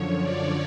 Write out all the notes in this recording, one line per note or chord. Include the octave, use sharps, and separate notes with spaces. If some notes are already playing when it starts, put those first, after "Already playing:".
Already playing: F#2 D3 F3 C#5
D5